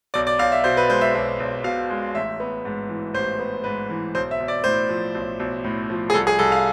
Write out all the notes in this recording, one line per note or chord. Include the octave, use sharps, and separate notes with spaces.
B1 D5
D5
B1 F5
E5
B2 C5
B4
G#3 C5
E5
B1 E5
B1
B2 F5
G#3
A1 E5
B3
G#2
E3
A1 C5
B3
G#2 B4
E3
B1 C5
E5
B1
D5
A2 C5
F3
B1
B1
A2
F3
G#4
C2 A4
G#4
C2 A4
F5